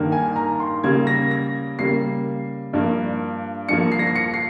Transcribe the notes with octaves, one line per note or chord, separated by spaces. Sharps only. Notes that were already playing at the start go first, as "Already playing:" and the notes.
Already playing: G2 D#3 A#3
G#5
A#5
C6
C#3 G3 A#3 G#6
A#6
A#6
C#3 G3 A#3 C7
G2 F3 A#3
G2 F3 A#3 C#7
C7
A#6
C7
C#7
C7